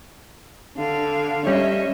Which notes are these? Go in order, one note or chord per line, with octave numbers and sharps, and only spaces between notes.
D3 F5
G3 C#4 C#5 D#5 E5